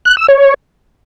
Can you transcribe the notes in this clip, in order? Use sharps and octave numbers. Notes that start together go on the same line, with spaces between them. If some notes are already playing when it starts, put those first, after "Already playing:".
F#6
E6
C#5